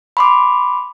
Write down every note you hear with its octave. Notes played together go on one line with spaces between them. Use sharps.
B5 C6 D6